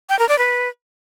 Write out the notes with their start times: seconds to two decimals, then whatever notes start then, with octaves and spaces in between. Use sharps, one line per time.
0.09 G5
0.19 A#4
0.29 D5
0.39 B4